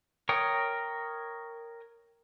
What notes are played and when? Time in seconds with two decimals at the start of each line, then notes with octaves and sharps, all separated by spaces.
0.29 A#4 C#5 G5 D#6